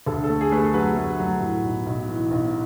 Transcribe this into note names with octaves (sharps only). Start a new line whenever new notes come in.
D2 A4
A4
A3
G#4
A3 B4
A4
F#3 B4
A3
F#3
A2
B1
B1
E3
B1